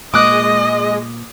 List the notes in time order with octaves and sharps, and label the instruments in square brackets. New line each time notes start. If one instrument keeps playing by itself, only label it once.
[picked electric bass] A#2 [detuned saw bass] G#3 [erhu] D#5 [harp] D6 D#6 F#6